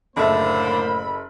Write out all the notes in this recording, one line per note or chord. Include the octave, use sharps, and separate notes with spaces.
F#1 A2 D3 A#3 A4 C5 E5 B5